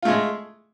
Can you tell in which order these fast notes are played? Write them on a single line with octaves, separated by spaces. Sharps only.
F4 A3 G#3